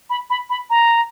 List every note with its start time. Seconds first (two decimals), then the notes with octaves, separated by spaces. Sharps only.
0.10 B5
0.30 B5
0.50 B5
0.70 A#5